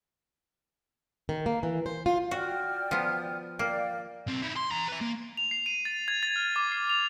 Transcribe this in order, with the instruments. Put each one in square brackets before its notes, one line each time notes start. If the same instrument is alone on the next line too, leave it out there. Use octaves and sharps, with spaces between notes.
[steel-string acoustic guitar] D#3
A#3
E3
C5
F4
[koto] F#4 [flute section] D5 G5 F6
[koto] F3 B3
[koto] A#3 [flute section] D5 F5 G5
[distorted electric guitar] B1 C4
D#4 E4
C6
E2 A#5
B4 E5
A#3
[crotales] F7
C7
D#7
A6
G#6
A6
F6
D6
C7
F7